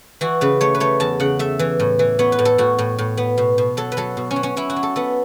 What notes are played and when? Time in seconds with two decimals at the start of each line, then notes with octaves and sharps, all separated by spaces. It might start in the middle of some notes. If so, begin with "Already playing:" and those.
0.21 E3 F#4
0.41 C#3 B4
0.61 A3 C#5
0.75 B4
0.80 A3 C#5
1.00 E2 A5
1.20 C#3 F#5
1.39 A3 E5
1.59 E3
1.80 A2
1.99 E3
2.19 B3 C#5
2.32 B4
2.39 A2
2.45 A4
2.58 A2 F#4
2.78 A2
2.98 A2
3.17 B3
3.38 B2
3.58 B2
3.77 F#3 A4
3.92 B4
3.97 F#3 A4
4.17 B2
4.31 C#4
4.36 F#3
4.43 C#4
4.57 C#4 E4
4.70 F#4
4.76 F#3
4.83 A4
4.96 B3 A4